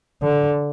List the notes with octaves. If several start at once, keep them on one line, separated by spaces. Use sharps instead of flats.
D3